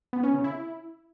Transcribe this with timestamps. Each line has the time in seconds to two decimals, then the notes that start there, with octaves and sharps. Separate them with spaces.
0.13 B3
0.23 C#4
0.34 C#3
0.44 E4